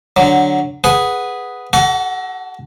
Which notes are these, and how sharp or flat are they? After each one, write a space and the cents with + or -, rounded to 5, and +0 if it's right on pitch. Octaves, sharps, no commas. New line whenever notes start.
D3 +0 F#3 +0
G#4 +0 B4 +0 F#5 +0
F#4 +40 A4 +0 F#5 +0